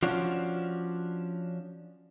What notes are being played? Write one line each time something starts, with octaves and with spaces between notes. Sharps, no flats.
F3 C#4 D4 F#4